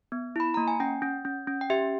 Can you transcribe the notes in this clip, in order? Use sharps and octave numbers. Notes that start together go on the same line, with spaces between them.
B3
E4 B5
A#3 A#5
G#5
C#4 G5
C#4
C#4
C#4
G5
G4 E5